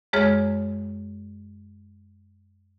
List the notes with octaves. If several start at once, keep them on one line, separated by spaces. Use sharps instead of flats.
F#2 G#3 G#4 C#5 F6